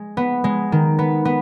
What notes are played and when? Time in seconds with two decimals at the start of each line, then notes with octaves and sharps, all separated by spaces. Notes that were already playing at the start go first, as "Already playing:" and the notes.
Already playing: G#3
0.17 B3
0.44 G#3
0.72 D#3
0.99 B3
1.25 B3